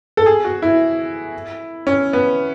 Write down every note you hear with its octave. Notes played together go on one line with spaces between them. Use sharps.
A4
G#4
F#4
E4
C#4
B3